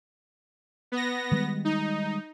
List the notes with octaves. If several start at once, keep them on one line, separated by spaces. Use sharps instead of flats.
B3 A#6
D#3 G3 G#3
D#4